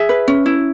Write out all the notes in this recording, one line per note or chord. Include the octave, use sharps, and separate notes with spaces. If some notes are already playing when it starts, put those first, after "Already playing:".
Already playing: G#4 E5
B4
C#4
E4